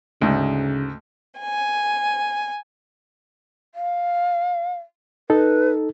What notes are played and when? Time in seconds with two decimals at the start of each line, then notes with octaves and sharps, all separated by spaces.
0.21 D2 G#2 C#3
1.40 G#5
3.75 F5
5.30 D#4 A4 B4